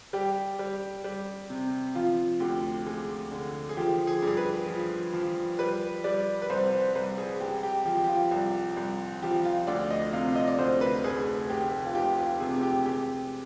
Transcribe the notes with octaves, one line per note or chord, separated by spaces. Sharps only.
G3 G4
G3
G3
C3
F3 F4
D2 G4
G#3
D3
G#4
F3 G4
G#4
G2
G#4
B4
F3
F3
G3 B4
G3 D5
B4
C2 C5
C5
C2 B4
G#4
G#3 G4
G4
F3 G4
G4
F4
C2
C2
F3 G4
F4
D2 D5
D#5
C3 F5
D#5
D5
D2 C5
B4
F1 G#4
F1 G4
F4
F1 G4
F4
C3 G#4
G4
G#3 G4